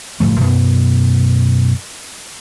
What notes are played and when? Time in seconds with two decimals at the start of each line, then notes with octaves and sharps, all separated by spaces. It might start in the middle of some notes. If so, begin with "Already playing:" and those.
0.20 F#1 A2 F3 A3
0.40 F#2 B2 B3